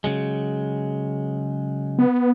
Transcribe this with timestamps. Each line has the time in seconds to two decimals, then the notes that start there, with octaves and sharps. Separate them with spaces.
0.04 C#3 F#3 G#3
1.98 B3